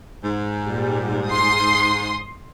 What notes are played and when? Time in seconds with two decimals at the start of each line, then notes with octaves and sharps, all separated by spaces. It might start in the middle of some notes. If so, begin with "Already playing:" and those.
0.24 G#2
0.68 A#2 G3
1.27 C6 D#6